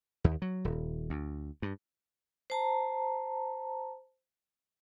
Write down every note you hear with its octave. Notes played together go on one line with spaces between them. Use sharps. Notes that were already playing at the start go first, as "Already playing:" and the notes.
D#2
F#3
D#1
D2
G2
C5 A5 A#5